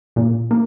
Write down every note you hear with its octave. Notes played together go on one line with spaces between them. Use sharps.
A#2
A#3